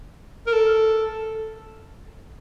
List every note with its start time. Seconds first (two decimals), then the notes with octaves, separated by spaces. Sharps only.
0.47 A#4
0.53 A4